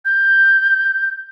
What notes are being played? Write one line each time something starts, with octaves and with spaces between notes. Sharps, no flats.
G6